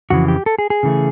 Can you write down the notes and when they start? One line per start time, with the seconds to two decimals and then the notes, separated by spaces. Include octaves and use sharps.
0.10 F2 C#3 E3 F#4
0.28 G4
0.46 A4
0.59 G#4
0.70 G#4
0.83 C#3 E3 A3